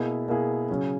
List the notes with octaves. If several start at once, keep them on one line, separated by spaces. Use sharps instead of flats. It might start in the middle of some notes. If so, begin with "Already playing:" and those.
Already playing: B2 A#3 E4 G#4
B2 A#3 E4 G#4
C#3 F#3 C#4 G#4